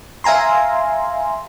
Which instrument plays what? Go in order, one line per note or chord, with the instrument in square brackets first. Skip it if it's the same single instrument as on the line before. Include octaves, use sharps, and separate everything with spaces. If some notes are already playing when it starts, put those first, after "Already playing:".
[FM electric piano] E5 F5 G#5 A#5 C6